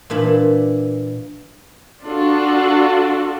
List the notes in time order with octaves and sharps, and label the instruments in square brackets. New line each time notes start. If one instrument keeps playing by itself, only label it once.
[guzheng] A#2 E3 D4 B5
[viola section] D4 F4 F#4 A4